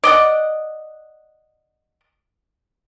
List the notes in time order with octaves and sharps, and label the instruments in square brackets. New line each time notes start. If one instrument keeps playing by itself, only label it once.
[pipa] D5 D#5 F#5